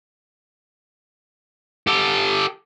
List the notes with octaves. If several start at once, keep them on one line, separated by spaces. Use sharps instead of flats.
G4 A4